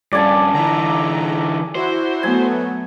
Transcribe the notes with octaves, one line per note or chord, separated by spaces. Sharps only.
G2 C#4 D5 G#5 A5
D3 E3 A#5
E4 F#4 C5
F#3 A3 B3 G#5